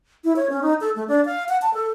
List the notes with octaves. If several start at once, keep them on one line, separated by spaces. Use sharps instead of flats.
E4
C#5
C#4
D#4
A4
A3
D4
F5
F#5
A5
A4